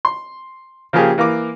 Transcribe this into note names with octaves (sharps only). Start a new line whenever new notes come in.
C6
C#3 F3 A#3 G4 G#4
E3 A#3 F5 D6